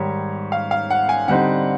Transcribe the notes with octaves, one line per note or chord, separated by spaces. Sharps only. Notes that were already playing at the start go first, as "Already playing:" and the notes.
Already playing: G#2 D#3 G3 C#5
F5
F5
F#5
G#5
D3 G3 C4 D#4 F#5